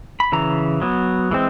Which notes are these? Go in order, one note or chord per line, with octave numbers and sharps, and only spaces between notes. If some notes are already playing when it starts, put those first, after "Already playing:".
B5
C#3 E3 A#5
F#3 B3
E3 G#3 C4